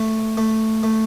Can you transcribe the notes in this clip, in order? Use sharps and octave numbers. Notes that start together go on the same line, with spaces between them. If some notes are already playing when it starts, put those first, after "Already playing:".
Already playing: A3
A3
A3